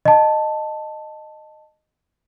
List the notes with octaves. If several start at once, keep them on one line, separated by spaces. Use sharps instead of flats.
D#5 A5